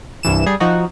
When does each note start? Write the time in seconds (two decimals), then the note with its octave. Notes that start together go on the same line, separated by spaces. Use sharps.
0.23 C2 G2 E3 E7
0.46 G3 G#4
0.60 F3 D#4 F#4